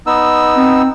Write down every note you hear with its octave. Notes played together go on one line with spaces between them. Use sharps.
B3 D#4 E6
C4